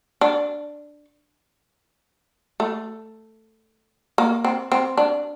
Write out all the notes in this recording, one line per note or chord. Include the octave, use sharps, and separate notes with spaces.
D4
A3
A#3
C4
C4
D4